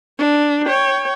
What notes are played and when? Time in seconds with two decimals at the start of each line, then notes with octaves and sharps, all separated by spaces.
0.19 D4
0.66 C#5 G5